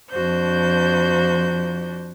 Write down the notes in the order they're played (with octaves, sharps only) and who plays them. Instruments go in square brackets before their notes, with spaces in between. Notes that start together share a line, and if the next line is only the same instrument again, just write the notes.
[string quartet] F2 F3 D4 F#4 C5 G6